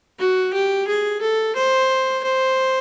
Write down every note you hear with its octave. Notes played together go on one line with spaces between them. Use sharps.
F#4
G4
G#4
A4
C5
C5